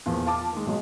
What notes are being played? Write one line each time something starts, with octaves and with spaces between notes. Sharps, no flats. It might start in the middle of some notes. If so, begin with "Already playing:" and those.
E2 A#2 F3
F5 A5 D6
D#3 G#3
B1 F#3 G#3